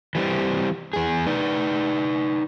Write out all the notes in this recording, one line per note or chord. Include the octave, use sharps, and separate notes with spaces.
E3 G3 B3 C4
E2 G#4
D#4 B4 D5